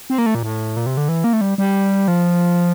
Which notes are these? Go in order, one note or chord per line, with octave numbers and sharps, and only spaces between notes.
C4
A#3
A3
A#2
A2
A#2
C3
D3
E3
A#3
A3
G3
G3
F3